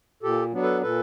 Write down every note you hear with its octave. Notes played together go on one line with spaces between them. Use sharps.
A#2 G4 A4
F#3 B3 D4
A4 B4
A#2 A4 B4